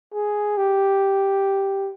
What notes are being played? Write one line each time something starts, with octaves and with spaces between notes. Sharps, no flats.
G#4
G4